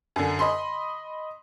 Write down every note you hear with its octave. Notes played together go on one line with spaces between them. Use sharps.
F#2 D3
D#5 B5 C6